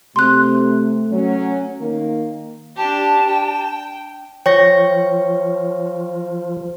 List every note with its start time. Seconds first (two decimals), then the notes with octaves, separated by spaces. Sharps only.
0.16 C3 A3 C6 F#6
1.11 F#3 C#4
1.81 D#3 A#3
2.76 D4 G4 A5
3.29 G5
4.46 F3 C#5 G5 C#6 A#6